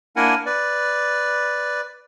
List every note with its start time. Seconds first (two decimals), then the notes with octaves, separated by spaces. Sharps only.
0.16 A#3 D4 E4 A#4 F#5 G#5
0.46 B4 D5